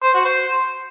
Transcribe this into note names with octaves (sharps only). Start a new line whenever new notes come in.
C5
F#4
C5